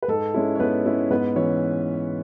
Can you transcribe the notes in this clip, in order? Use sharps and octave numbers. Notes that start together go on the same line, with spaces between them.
B4
G#2 A4
G#3 C#4 E4
C#5
G#2 B3 B4
G#3 C#4 E4
G#2 B3 B4
E3 C#4 C#5